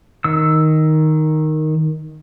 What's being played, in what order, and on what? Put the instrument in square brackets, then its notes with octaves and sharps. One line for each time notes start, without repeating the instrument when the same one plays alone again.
[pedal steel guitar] D#3 E6